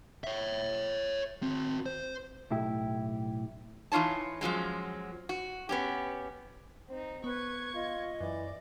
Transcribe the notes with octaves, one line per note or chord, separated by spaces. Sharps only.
C#5 E5
C4 F#4
C5
B1 A2 E4 G4
E3 D#4 F4 C#5 A5
F#2 F3 F#3 G#3
F#4
B3 C#4 G4
C4 D#4
B3 B4 C#6 G#6
F4 D#5
F#2 E3 D5